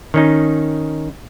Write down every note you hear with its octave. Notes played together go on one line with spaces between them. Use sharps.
D#3 C#4 D#4